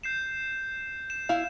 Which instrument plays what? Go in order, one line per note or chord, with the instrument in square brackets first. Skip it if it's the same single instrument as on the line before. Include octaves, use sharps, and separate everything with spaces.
[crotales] G6 C7 E7
E7
[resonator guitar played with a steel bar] E4 F5